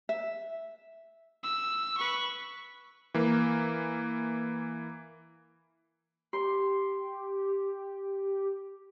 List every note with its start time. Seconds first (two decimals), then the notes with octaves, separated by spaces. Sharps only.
0.09 E5
1.44 E6
1.98 B4 C#6
3.14 E3 A#3
6.33 G4 C6